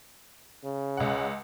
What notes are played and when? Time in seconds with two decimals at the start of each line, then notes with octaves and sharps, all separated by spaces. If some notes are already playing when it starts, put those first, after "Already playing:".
0.64 C#3
0.97 C#2 F#5